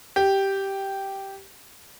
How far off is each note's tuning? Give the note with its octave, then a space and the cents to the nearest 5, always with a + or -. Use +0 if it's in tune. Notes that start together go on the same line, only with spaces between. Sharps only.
G4 -5